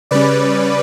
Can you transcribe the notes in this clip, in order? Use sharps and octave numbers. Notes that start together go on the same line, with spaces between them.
C#3 G3 C#4 B4 D5